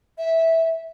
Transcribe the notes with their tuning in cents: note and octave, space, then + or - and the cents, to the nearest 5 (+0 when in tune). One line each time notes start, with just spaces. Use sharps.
E5 -10